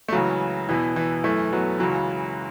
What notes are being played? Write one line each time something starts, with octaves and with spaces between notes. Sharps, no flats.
A3
C#2 C#3 E3 F#3
E2 B2 E3
E3
F#2 E3 A3
F#3 B3
C#2 C#3 E3 F#3